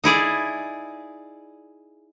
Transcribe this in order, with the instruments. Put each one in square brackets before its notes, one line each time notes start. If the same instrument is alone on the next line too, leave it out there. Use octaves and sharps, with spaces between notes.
[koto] D#4 E4 G#4 D5